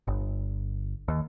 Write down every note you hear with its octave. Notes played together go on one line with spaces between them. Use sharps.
G1
D#2